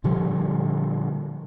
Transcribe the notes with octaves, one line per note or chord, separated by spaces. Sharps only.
A#2 D3 F3 G3